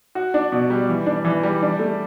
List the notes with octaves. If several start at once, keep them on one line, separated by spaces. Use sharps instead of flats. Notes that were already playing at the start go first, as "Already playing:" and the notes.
F#4
D4
B2
G3
E3
D4
E3
G3
D4
A3